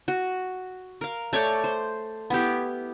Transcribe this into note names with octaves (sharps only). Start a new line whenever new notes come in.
F#4
A#4 F5
A3 C#5 D5 G5
C5
B3 E4 G4